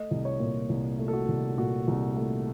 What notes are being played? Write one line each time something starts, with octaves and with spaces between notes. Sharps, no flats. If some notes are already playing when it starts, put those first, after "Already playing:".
Already playing: A3 D#5
C2
C#5
A#2
C2
A3
A4
F#4
C2
A#2 F#4
C2
A3